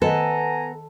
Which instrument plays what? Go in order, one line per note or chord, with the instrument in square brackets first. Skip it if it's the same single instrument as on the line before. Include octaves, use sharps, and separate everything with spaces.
[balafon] D#3 D#5 [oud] B3 [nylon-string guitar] A4 [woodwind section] G#5 A#5